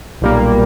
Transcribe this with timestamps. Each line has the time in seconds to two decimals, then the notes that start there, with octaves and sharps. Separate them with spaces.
0.22 B1 A#2 G3 A#3